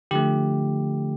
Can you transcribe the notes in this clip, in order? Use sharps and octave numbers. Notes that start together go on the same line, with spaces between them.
D3 F3 A3 G4